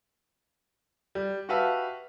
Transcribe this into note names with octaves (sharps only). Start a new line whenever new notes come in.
G3
F#4 G4 B4 E5 F5 A5